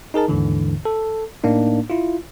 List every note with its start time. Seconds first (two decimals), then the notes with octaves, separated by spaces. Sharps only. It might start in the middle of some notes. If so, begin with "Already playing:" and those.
0.14 D#4 G#4 A#4 A5
0.28 D#2 G#2 D3 E3
0.85 A4
1.43 A2 A#3 D4 D#4
1.90 E4 F4